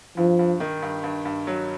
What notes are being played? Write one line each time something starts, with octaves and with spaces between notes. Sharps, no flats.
G2 F3
G2
D#3
G2
G2
G2
F#3